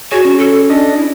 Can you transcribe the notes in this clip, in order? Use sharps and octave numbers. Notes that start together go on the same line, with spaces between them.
F#4 G#4 C#5
C#4
A4
C#4 D4 D#5
E4